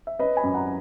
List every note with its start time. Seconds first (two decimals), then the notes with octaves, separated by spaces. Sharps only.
0.07 E5
0.19 C#4 B4 D#5
0.37 G#5 B5
0.43 F#2
0.54 F#5 A#5